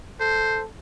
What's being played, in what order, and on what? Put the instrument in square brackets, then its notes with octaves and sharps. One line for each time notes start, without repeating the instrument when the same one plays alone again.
[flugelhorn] A4 [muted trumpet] C5